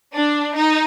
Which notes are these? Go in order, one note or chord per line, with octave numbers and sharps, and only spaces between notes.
D4
D#4